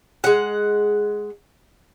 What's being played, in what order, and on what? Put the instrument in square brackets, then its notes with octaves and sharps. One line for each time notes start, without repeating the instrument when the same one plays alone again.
[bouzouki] G#3 F#5